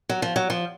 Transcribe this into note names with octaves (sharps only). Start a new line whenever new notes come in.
F#3
F3
F#3
F3